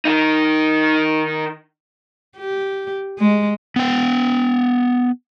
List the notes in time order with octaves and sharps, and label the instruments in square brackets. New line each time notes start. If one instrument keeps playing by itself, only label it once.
[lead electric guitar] D#3 D#4
[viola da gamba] G4
G#3
[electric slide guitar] B3 G5